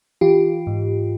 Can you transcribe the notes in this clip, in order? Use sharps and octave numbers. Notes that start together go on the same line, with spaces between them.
E3 F4 G4
G#2